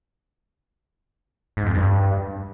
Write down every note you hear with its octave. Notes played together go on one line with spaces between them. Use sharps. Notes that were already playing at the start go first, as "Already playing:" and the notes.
G#2
F2
G2